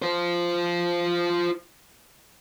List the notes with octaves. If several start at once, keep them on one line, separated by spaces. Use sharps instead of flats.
F4 C5